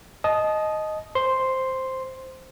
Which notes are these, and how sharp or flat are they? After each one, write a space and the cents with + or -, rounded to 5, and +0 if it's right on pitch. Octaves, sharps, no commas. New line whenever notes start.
D#5 +0 A5 -30 D#6 +0
C5 +0 C6 +0